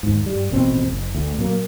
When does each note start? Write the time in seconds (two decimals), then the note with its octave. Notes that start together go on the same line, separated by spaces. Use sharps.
0.03 D#2 G#2
0.26 G2 G3
0.50 D#1 A1 B2 C4
0.86 F#1
1.15 D2
1.38 A#2 F#3 A#3